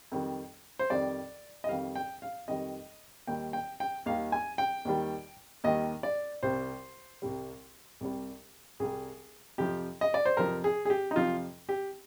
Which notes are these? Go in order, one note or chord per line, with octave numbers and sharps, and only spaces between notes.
F2 D#3 G3
C5
F2 D#3 G3 D5
D#5
F2 D#3 G3 F5
G5
F5
F2 D#3 G3 D#5
D#2 D#3 G3 G5
G5
G5
D#2 D#3 G3 F5
G#5
G5
D#2 D#3 G3
D#2 D#3 G3 D#5
D5
C2 C3 G3 C5
C2 C3 G3
C2 C3 G3
C2 C3 G3 G#4
F2 C3 F3 G4
D#5
D5
C5
F2 C3 F3 A#4
G#4
G#4
G4
D#4
F2 C3 F3 F4
G4